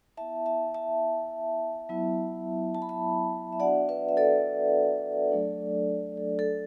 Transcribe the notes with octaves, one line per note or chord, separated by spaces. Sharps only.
B3 E4 E5 A5
E5 A5
E5 A5
F#3 B3 E4
A5
B5
E5 A5
E5
B3 D4 F#4 D5 F#5
B4 E5
E5
A4 D5
F#3 A3 D4
A4
A4